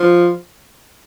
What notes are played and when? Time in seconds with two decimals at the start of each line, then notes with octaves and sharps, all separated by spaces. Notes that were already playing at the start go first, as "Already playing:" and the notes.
Already playing: F3